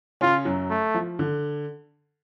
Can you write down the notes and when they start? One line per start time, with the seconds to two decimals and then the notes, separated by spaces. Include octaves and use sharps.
0.21 C#3 C#4 F4
0.45 F#2 F#3
0.70 A3
0.94 F3
1.19 D3